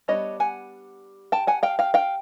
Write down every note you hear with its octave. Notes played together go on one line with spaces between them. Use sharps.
G3 B3 D4 C#5 D#5
F#5 G#5
G5 A5
F#5 G#5
F5 G5
F5 G5
F5 G5